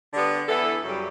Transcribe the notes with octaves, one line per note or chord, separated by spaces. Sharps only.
D3 G3 B3
E3 B3 E4 A4
F#2 C#3 G3